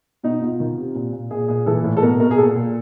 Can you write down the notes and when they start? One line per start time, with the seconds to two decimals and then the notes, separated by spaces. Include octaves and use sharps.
0.23 B2 D#4
0.41 B2 F4
0.60 D#3
0.77 C3
0.95 A#2
1.12 A#2
1.31 A#2 G#4
1.48 A#2 G#4
1.66 E3 A4
1.84 A2
1.97 A4
2.02 B2 A#4
2.20 B2 A#4
2.31 G#4
2.38 A#2 A4
2.55 A#2